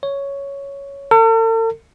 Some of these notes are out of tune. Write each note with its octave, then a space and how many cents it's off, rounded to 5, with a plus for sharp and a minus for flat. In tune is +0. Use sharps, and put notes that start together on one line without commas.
C#5 +5
A4 +45